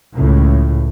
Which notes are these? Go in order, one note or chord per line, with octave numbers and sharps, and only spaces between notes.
C#2 A2